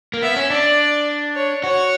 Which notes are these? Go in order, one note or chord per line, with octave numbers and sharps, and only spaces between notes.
A#3
B3 E5
C#4
D4 D5
C#5
F#4 C#5